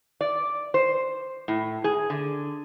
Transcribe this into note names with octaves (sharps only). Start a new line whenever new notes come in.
D5
C5
A2
G#4
D3